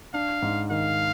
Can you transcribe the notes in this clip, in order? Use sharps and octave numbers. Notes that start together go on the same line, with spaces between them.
D4 F5
G#2
D#3 F5